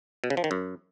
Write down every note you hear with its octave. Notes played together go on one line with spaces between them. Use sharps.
B2
C#3
F3
D#3
F#2